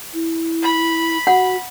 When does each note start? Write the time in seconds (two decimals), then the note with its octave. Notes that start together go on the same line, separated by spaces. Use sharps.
0.14 E4
0.63 B5
1.27 F#4 F#5